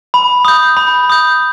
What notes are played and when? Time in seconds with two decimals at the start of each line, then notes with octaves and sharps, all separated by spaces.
0.14 B5
0.45 D#6 G6
0.77 B5
1.10 D#6 G6